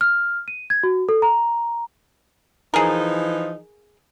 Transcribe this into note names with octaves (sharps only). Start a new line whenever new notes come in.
F6
D#7
G#6
F#4
A4
A#5
E3 F3 D#4 G#4 A#4